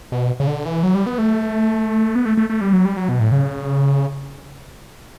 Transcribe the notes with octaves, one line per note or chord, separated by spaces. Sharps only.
B2
C#3
D3
E3
F#3
G3
B3
A3
B3
A3
A3
A3
G3
F#3
G3
F#3
B2
A2
C#3